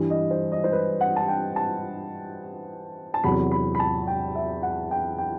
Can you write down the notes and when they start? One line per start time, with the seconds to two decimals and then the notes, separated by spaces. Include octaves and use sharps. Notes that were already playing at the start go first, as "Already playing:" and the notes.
Already playing: G2 E3 G3
0.10 D#5
0.31 C5
0.52 D#5
0.64 C5
0.72 B4
1.01 F#5
1.16 A5
1.28 G5
1.56 A5
3.14 A5
3.24 E2 C3 F#3 B5
3.52 B5
3.75 B5
3.80 A5
4.07 G5
4.35 E5
4.63 F#5
4.91 G5
5.18 G5